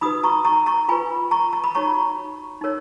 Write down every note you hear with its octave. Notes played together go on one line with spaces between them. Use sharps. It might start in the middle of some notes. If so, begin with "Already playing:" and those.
D#4 F#4 B4 B5 D#6
A#5 C#6
A#5 C#6
A#5 C#6
F4 B4 G#5 B5
A#5 C#6
A#5
B5
D#4 F#4 C#5 A#5 C#6
D#4 A#4 C#5